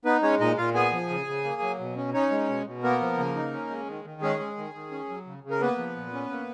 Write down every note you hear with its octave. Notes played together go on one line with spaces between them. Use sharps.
B3 D#4 B4
G#3 C#4 C#5
A#2 D#4 D#5
A#2 F4 F5
B3 G#4 G#5
F3
C#3
C#3
A#3
F#3
B2
C#4
C#4 D#4 C#5
G#3
B2
B2
A#3 B3 A#4
F3
C#3
D#4
C#4
G#3
D#3
D#3
G#3 C#4 G#4
G#3
D#3
D#3
C#4
F#3
C#3
C#3
A#4
A#3 B3 B4
F3
A#2
C#4
A#3